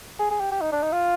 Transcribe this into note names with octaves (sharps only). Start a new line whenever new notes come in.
G#4
G#4
G4
G4
D#4
D4
D#4
F4